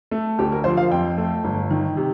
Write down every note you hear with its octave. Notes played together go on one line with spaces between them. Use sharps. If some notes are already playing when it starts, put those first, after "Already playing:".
A3
D2 G4
A#4
F3 C5
F5
F2 G5
A3
G1
D#3
C3